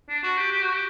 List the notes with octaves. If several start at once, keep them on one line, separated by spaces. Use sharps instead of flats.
D4
F#4
G4
G4
F#4
G4